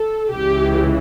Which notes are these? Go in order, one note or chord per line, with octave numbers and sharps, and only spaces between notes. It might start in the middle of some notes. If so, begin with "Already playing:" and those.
Already playing: A4
C#2 C#3 E3 G4